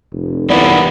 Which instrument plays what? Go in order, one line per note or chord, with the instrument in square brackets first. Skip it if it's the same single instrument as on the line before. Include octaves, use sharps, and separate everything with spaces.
[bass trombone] F1
[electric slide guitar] E3 G3 A#3 [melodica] B3 E4 [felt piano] B4 D5